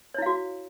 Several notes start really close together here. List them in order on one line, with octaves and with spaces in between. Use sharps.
C#5 E4 F5 F#4